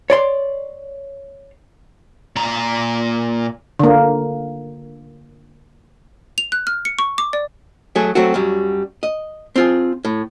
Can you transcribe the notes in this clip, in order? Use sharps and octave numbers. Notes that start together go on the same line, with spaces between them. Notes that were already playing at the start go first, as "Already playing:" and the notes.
C#5 D5 C6
A#2 A#5
D3 A#3
F7
F#6
F6
C#7
C#6
D6
D5
F#3 A3 G#4
F#3 A3 C4 F#4
F#2 F#3 G3
D#5
C4 F4 G#4
A2